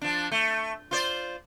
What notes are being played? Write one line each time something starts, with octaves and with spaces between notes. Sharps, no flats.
F3 D4
A3
F4 C5 D5